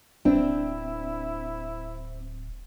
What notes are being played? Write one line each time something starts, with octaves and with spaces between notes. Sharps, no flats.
D1 C4 D4 E4